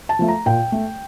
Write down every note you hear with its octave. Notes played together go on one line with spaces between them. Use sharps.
A5
F3 A3
A#5
A#2 G5
A3